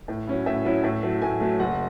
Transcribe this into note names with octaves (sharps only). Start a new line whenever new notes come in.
A2
F#3 C#4 E4
A2 E5
F#3 C#4 E4
A2
F#3 A3
A2 G#5
F#3 A3
F#1 F#5